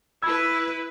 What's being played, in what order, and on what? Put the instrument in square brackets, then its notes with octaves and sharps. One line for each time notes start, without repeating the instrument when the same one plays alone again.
[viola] E4 B4 [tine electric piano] B5 E6 [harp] G#6